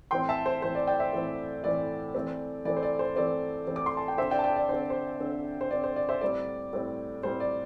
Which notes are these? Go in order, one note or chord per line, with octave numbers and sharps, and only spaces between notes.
A2 E3 C4 G5 C6
E5 A5
C5
A2 E3 C4 C5
D5
D5 G5
C5 E5
A2 E3 C4
A2 E3 C4 D5
E3 A3 C4
E3 A3 C4 D5
C5
D5
C5
E3 A3 C4 D5
E3 A3 C4
D6
C6
A5
G5
D3 C4 C5 E5
D5 G5
A5
D5 G5
D5
D3 C4 C5
C5
D3 C4
C5
D3 C4 D5
C5
D5
C5 E5
A2 G3 C4 D5
A2 G3 C4
A2 G3 C4 C5
D5